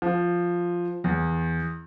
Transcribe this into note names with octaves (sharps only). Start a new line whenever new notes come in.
F3
E2